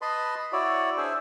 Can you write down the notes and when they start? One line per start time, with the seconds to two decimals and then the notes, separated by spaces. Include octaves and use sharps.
0.02 B4 D#5 A5 B5 C6
0.52 E4 F#4 C#5 D5
0.97 D4 G#4 C5 E5